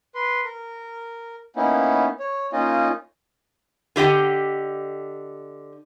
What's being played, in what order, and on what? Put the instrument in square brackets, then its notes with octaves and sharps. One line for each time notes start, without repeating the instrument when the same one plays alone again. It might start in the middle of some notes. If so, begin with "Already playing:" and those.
[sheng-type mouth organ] B4 C6
A#4
A#3 B3 C#4 D#4 E4
C#5
A#3 C#4 D#4 F4 D#5
[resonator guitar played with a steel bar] D3 G4 D#5 G5